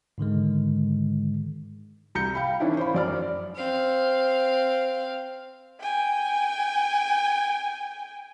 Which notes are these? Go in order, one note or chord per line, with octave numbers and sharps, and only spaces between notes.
G#2 D3 D#3 G#3
C2 A#5 G6 C#7
F5 G5 B5
D#3 E3 C#4 D4 E4
C5 C#5 F5 B5
F#2 D5 F6
C4 F5
G5 G#5